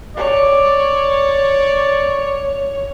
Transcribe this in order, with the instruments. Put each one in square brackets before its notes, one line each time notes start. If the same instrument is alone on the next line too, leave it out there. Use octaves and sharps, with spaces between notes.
[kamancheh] C#5 [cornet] D5